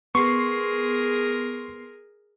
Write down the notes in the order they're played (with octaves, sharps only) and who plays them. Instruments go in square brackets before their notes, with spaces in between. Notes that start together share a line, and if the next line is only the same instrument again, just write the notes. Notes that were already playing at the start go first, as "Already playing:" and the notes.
[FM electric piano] B3 C6 C7 [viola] G#4 A#4 [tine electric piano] C#6